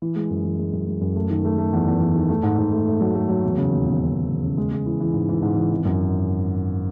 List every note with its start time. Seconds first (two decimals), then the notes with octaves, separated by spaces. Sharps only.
0.02 E3
0.16 G#3
0.30 F#2
0.44 E3
0.59 G#3
0.73 F#2
0.87 G#3
1.01 F#2
1.16 A3
1.30 D#3
1.45 A3
1.58 A3
1.73 E2
1.87 E2
2.01 E2
2.15 D#3
2.29 A3
2.43 G#2
2.58 G#2
2.73 A3
2.87 A3
3.01 F#3
3.15 A3
3.29 F#3
3.43 E1
3.57 C#3
3.71 D#2
3.86 E1
4.00 C#3
4.15 E1
4.28 E1
4.43 C#3
4.57 G#3
4.71 G#3
4.86 E3
5.00 E3
5.14 G#2
5.29 E3
5.42 G#2
5.57 E3
5.71 G#1
5.85 F#2